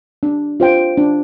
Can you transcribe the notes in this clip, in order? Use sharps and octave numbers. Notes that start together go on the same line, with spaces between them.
D4
F4 C5 G5
D4